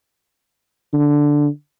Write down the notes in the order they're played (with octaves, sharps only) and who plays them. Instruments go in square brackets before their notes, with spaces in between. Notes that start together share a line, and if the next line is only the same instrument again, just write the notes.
[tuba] D3